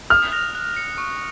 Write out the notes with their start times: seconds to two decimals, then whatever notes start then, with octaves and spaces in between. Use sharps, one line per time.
0.10 D#6 F6
0.32 F#6 A#6 F7
0.55 F#6
0.77 C#7 F7
0.98 C#6